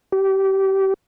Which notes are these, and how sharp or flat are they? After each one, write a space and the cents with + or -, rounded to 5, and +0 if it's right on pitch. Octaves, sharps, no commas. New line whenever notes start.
G4 -25